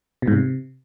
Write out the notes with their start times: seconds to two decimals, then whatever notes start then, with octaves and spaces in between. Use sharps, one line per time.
0.22 B2
0.28 G#2
0.33 C3